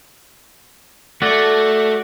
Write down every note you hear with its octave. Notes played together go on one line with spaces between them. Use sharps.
A3 F#4 D5